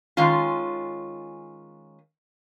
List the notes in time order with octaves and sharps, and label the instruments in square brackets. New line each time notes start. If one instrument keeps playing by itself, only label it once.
[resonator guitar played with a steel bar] D#3 G#3 C#4 F4